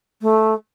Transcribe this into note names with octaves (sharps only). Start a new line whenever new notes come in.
A3